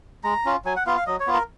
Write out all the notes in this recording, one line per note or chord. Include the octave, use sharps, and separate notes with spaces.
G#3 A#5
C#4 F4
F#3 G#5
F#5
B3 F4 F5
F5
F#3 D#5
C#5
B3 F4
A#4